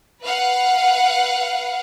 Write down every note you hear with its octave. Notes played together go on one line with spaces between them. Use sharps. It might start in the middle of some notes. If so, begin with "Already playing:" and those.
B4 F5 F#5